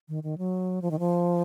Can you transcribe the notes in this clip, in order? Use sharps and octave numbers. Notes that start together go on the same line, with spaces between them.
D#3
D#3
F#3
F3
D#3
F3